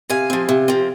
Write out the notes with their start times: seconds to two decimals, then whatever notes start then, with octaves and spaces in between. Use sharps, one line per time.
0.10 C3 F5 G#5
0.30 F3 C4
0.49 C3
0.68 F3 C4